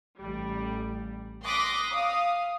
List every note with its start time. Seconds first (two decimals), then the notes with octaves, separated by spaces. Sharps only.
0.19 A1 G3
1.44 C6 D6 D#6 F#6 A#6 B6
1.91 F5 D#6